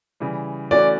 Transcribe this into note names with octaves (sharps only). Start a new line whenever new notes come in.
C#3 E3 G3
E3 A3 C#4 F#4 D5